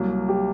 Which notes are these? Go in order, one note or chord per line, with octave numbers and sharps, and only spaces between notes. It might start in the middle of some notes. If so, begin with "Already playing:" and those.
Already playing: C2 F#3 A#3
G4